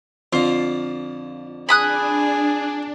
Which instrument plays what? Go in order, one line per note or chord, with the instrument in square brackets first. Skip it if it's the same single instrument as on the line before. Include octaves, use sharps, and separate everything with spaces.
[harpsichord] F2 D3 [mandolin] F4
[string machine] D4 [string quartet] G#4 [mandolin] B5 D#6 F#6